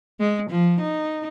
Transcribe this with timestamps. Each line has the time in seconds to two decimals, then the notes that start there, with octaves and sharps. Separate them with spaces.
0.20 G#3
0.51 F3
0.81 D#4